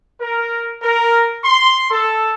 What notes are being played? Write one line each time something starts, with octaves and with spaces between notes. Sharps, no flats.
A#4
A#4
C6
A4